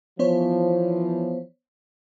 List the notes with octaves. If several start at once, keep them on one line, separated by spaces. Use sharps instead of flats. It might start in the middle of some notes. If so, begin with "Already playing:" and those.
E3 F3 B3 C5 C#5